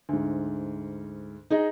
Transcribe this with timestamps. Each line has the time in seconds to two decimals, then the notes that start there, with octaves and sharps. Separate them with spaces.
0.09 D2 G#2
1.50 D#4 G#4 D#5 A#5